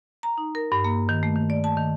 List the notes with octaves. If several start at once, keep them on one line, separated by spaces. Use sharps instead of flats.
A#5
D#4
A#4
G2
A#3
D#3
A3
D#3
D5
A5
D#3